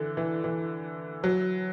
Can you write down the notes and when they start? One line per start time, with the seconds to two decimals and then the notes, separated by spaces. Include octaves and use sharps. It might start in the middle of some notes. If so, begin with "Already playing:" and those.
Already playing: D3 E3
0.17 E3
0.44 E3
1.24 F#3